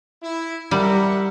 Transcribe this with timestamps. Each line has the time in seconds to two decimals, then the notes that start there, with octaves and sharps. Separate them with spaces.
0.23 E4
0.71 G3 A#4 E5 F#5